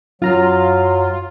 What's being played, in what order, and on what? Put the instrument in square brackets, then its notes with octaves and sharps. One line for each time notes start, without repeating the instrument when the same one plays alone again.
[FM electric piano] F#2 A#5 F6 [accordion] F#3 [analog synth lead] F4